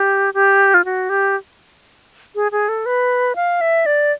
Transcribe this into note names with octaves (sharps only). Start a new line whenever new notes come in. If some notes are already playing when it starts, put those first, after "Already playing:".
Already playing: G4
G4
F4
F#4
G4
G#4
G#4
A4
B4
F5
E5
D5